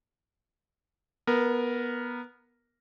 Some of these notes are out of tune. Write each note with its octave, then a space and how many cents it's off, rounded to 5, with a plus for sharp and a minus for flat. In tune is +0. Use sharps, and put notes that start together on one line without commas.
B3 -15 A#4 +0